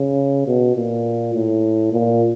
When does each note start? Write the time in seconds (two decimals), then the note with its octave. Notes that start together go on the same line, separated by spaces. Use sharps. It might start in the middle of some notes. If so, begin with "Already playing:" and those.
Already playing: C#3
0.47 B2
0.76 A#2
1.34 A2
1.92 A#2